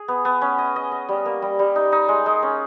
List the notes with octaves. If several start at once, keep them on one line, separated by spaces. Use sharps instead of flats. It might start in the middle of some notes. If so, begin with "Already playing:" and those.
Already playing: G#4
B3
B3
C#4
D#5
D#5
D#5
G3
A#3
G3
G3
D#4
D#4
G#3
G#3
C#4